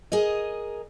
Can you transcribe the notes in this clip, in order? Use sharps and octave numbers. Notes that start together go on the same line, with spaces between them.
G#4 A#4 D#5